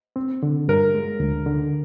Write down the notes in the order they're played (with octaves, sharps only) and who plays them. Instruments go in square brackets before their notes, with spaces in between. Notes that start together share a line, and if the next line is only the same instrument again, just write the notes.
[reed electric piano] C4
D3
[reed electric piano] G2 [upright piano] A#4
[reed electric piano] G#3
D2
D3